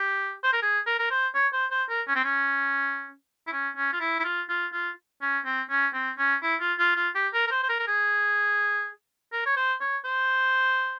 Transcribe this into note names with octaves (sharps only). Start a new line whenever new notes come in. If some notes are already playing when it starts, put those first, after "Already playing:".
Already playing: G4
C5
A#4
G#4
A#4
A#4
C5
C#5
C5
C5
A#4
C#4
C4
C#4
E4
C#4
C#4
F4
E4
E4
F4
F4
F4
C#4
C4
C#4
C4
C#4
E4
F4
F4
F4
G4
A#4
A#4
C5
C5
A#4
A#4
G#4
A#4
C#5
C5
C#5
C5